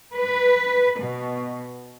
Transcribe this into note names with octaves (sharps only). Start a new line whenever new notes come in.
B4
B2